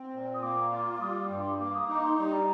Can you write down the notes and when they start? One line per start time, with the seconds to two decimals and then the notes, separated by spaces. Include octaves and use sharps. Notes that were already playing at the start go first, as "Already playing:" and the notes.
Already playing: C4
0.13 A#2
0.34 D#6
0.42 A#3 D6
0.72 F4
0.94 D6
1.01 G3 D#6
1.20 D6
1.30 G2
1.40 C6
1.60 A#3 D6
1.74 D#6
1.89 D#4 D6
2.03 C6
2.18 G3 A#5